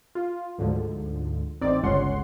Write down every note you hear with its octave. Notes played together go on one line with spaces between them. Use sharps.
F4
D2 G#2 D3 F3
A1 C4 D#4 D5
G1 C#2 C#4 F#5 C6